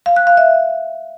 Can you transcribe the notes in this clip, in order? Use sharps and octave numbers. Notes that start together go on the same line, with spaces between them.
F5
F#6
F5
E5